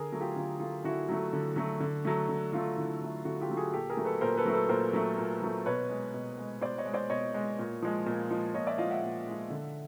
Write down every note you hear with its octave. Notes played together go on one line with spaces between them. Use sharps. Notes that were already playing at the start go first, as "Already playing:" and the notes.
Already playing: D3 G#4 A#4
F#3 A3
F4 G4
D3 F4
F#3 A3 F4
D3 E4 F#4
F#3 A3
D3
F#3 A3
D3
F#3 A3
D3
F#3 A3 F4
D3 E4
F#3 A3
D3 E4 F#4
F4 G4
F#3 A3
F#4 G#4
A#2 G4 A4
G#4 A#4
F#3 A3
A4 B4
A#2 A#4 C5
A4 B4
F#3 A3
A4 B4
A#2 A#4 C5
F#3 A3
A#2
F#3 A3
B2 B4 C#5
G#3
B2
G#3
B2 C5 D5
C#5 D#5
G#3
C5 D5
B2 C#5 D#5
G#3
A#2
F3 G#3
A#2
F3 G#3
A#2 C#5 D#5
D5 E5
F3 G#3 D#5 F5
E5 F#5
A#2
F3 G#3
D3